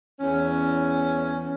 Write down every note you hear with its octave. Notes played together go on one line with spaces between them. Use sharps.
E2 C#4